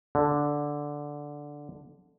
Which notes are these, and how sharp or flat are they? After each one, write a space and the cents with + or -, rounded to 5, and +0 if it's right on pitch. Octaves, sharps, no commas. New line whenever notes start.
D3 -5